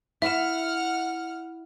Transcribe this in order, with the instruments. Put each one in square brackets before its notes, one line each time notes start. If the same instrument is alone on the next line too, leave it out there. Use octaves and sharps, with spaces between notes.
[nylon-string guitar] E4 [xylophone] E5 E7 [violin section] F#5 F6